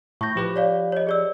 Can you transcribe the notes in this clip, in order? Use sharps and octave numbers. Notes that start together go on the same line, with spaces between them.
A2 C#6 G6 A#6
F3 G4 B4
C#5 D5 F5
C#5 D#5
G#4 D5 E6